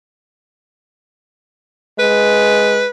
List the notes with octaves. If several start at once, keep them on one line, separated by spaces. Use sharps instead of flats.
G#3 B4